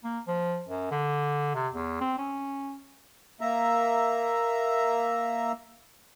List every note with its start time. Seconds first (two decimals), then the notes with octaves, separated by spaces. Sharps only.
0.04 A#3
0.27 F3
0.68 F#2
0.91 D3
1.54 C3
1.74 E2
2.01 C4
2.17 C#4
3.41 A#3 E5 A#5